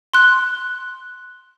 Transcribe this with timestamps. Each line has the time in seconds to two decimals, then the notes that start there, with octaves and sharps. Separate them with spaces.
0.14 C6 F#6